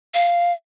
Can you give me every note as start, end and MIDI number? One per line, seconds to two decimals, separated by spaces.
0.14 0.52 77